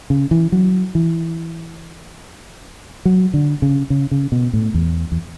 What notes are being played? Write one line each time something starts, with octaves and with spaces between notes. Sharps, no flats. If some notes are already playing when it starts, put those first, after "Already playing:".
C#3
E3
F#3
E3
F#3
D3
C#3
C#3
C#3
B2
A2
E2
E2